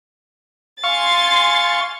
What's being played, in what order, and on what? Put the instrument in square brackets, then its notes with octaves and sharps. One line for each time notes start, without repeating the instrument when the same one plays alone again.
[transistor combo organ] F5 C#6 [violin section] G#5 C6 A6